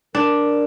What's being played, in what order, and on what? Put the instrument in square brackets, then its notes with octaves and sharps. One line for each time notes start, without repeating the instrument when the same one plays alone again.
[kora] D4 [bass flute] A#4